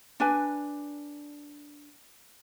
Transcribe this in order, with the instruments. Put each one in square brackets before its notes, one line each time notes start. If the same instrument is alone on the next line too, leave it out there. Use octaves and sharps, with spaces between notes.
[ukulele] D4 B4 G#5